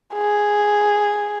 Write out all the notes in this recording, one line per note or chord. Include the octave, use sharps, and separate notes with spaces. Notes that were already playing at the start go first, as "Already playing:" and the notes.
G#4